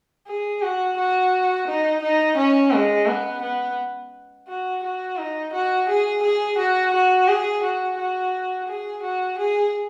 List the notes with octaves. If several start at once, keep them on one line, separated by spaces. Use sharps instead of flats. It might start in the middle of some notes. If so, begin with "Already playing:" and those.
G#4
F#4
F#4
D#4
D#4
C#4
G#3
B3
B3
F#4
F#4
D#4
F#4
G#4
G#4
F#4
F#4
G#4
F#4
F#4
G#4
F#4
G#4